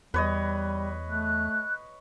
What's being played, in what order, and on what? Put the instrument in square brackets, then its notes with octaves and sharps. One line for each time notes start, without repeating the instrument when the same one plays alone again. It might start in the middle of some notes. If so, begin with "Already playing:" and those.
[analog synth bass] E2 [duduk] G3 [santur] B4 C#5 D#5
[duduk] A3 [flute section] F#6